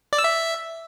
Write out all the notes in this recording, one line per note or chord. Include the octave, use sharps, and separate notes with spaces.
D5
E6
E5